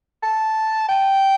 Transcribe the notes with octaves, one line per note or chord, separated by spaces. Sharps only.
A5
G5